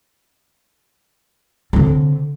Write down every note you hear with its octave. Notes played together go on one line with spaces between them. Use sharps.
D3 C4